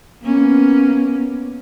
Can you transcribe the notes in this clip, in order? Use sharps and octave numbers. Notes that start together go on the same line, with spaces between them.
A#3 B3 C#4